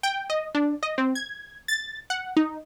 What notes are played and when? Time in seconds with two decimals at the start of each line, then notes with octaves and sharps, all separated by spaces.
0.03 G5
0.30 D#5
0.55 D4
0.83 D#5
0.98 C4
1.15 G#6
1.68 A6
2.10 F#5
2.37 D#4